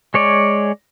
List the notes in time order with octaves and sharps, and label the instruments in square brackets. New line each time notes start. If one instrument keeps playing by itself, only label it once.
[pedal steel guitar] G#3 C#5 D5